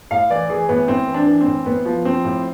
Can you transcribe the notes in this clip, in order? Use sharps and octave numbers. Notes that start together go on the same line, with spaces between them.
A2 F5
E3 D5
E3 G#4
A2 B3
A2 C4
E3
D4
E3
C4
A2
A2 B3
F3
F3 C4
A2